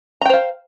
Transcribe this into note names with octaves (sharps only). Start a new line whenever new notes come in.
C5 F5 G5 A#5